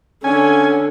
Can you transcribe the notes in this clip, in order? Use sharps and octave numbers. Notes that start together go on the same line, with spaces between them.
D3 C#4 G#5